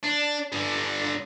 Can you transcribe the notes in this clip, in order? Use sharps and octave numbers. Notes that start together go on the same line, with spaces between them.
D4
G2 D3